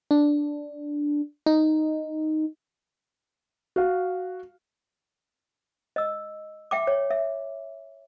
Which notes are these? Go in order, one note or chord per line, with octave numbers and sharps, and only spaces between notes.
D4
D#4
F#4 F5
D#5 E6
E5 G5 D6
C#5
E5